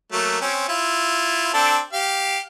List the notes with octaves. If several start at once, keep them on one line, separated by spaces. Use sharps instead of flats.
F#3 A3 A#3
C4 C#4
E4 F4
C4 D4 A4
G4 F5